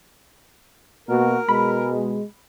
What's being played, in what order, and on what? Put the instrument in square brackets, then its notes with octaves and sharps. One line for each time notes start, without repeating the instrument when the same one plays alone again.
[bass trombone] B2 [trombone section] A#3 F#4 [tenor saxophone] A#4
[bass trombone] B2 [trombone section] G#3 [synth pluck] B5